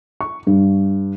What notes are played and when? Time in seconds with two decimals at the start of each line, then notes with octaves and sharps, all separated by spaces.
0.21 C#6
0.47 G2